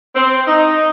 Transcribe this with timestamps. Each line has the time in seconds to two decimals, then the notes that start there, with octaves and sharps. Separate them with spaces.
0.15 C4
0.47 D#4